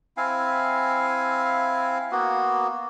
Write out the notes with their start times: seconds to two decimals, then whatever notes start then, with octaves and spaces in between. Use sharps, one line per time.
0.17 C4 E4 F5 G#5
2.11 A#3 B3 F#4